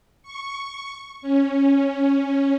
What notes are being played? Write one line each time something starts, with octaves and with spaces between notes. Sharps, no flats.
C#6
C#4